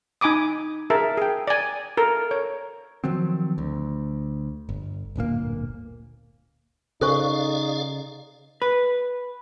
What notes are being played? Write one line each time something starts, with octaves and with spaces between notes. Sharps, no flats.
D#4 G#5 B5 D6 D#6
G#4 A#4 E5 A5
G#4 G5
D5 G#5
A4 A#4
C#5
D#3 F3 F#3 C4
D2
G1
D1 G1 A#2 A#3
C#3 D#4 G#4 A4 C5 D5 F5 C#6
B4